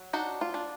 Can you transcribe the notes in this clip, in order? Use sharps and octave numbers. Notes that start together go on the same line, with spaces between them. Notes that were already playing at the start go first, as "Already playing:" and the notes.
Already playing: F#3
D4 D#4 F#4
F4
D4